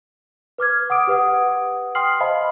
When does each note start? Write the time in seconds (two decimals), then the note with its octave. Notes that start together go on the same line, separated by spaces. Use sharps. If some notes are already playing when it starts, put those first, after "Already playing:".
0.58 B4 D6 F6 G#6
0.90 F#5 D6 D#6 D7
1.07 G4 B4 F#5 D#6
1.95 G5 C6 D#6 F6 C7 F#7
2.20 C5 D#5 F5 A5 B5